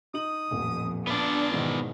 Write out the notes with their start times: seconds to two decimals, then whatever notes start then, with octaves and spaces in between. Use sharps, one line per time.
0.14 D#4 D#6 F#7
0.51 D#1 A1 F2
1.07 B3 D4 F4 D5
1.52 B1 G#2 D#3 E3